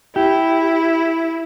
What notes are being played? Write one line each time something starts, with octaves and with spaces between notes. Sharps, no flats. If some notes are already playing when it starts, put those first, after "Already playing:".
E4 G4